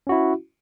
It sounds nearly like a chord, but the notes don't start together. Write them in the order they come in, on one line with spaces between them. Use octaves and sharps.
C#4 F#4 E4